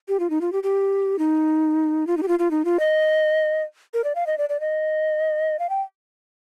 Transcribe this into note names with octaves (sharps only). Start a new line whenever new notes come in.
G4
F4
D#4
F4
G4
G4
D#4
F4
D#4
G4
F4
F4
D#4
F4
D#5
A#4
D5
F5
D#5
D5
D5
D#5
F5
G5